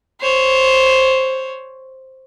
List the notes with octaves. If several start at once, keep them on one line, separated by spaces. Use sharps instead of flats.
C5 C#5